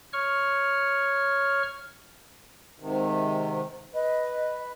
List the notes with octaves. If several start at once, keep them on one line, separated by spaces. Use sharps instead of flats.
C#5 C#6 F6
G#2 C3 D#3
B4 D#5